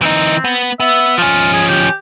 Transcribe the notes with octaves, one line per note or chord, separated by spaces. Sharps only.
E3 C4 D#4
B3
B3 E5
F3 C#4 F4
G#4
G4